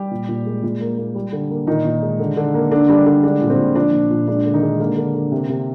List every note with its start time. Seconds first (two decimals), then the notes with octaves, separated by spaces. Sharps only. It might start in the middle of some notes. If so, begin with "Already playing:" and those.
Already playing: G3 G4
0.11 A#2
0.29 A#2
0.46 G#3
0.63 A#2
0.81 A#3
0.98 A#3
1.15 G3
1.32 D3
1.50 A#3
1.67 A#2 D#3 D#4
1.85 A#2
2.02 G#3
2.19 D3
2.37 D3
2.54 A#3
2.71 D3 D4
2.89 G3 D4
3.06 D3 D4
3.23 G#3 D4
3.41 A#2
3.50 C4
3.58 A#2
3.75 F3 D4
3.93 A#2
4.11 A#2
4.28 G#3 D4
4.45 D3
4.54 D#3 D#4
4.62 G#3
4.80 D3 A#3 A#4
4.97 D3
5.15 D3
5.32 C3
5.49 C3